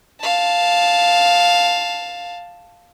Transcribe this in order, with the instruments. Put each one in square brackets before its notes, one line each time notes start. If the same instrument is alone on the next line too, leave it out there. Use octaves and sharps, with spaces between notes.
[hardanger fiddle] F5 A5